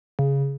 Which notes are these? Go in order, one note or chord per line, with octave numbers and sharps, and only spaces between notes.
C#3